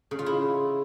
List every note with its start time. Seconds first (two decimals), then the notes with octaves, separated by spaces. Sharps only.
0.11 C#3
0.19 F4
0.26 E4